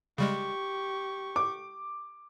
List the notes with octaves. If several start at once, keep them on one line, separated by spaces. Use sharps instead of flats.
C#3 G3 G#3 G4 C#6
D6